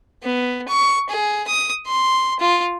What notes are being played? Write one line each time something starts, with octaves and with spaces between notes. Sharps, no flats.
B3
C#6
G#4
D#6
C6
F4